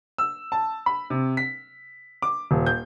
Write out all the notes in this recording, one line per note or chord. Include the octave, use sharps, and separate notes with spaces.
E6
A5
B5
C3
B6
D6
D#1
G6